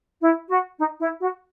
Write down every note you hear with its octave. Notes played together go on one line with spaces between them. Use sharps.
E4
F#4
D#4
E4
F#4